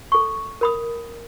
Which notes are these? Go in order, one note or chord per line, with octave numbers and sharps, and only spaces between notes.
A4 C#6
A#4 B5 D#6